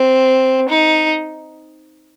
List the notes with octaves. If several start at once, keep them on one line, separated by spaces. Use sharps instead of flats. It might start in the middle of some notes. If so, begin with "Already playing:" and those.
Already playing: C4
D#4